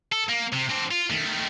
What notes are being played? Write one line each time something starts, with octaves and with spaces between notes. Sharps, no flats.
A4
A#3
C3
C4 D4
F4
D#3 A3